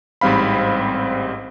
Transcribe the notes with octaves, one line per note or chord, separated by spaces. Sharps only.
A1 G#2 G3 C4 F5 B5